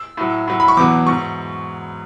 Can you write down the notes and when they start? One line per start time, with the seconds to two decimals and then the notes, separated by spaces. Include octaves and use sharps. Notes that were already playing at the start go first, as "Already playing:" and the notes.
Already playing: E6
0.17 A2 F#3
0.48 A2 F#3
0.60 B5
0.68 C#6
0.77 E2 B2 F#3 D6
1.07 G#2 F#3 C#6